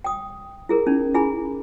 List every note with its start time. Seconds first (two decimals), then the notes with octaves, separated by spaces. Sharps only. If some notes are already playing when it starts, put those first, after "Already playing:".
0.04 G5 D#6
0.69 E4 G#4 A#4
0.87 C#4 D#4
1.14 E4 G#4 G#5 B5